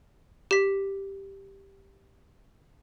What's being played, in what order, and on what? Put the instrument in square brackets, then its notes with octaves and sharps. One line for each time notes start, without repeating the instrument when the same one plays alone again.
[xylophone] G4 B6